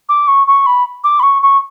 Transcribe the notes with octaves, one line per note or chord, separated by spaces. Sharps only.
D6
C#6
C#6
B5
D6
B5
C#6
C#6